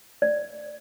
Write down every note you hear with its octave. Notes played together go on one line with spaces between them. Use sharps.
D5